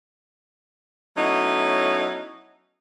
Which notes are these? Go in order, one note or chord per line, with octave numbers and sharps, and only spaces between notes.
F#3 A3 B3 C#4 D#4 E4